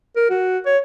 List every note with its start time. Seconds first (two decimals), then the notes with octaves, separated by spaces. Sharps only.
0.16 A#4
0.30 F#4
0.66 C#5